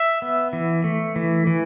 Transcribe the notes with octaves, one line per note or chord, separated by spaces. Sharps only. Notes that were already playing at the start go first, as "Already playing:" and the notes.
Already playing: E5
B3
E3
A3
E3
E3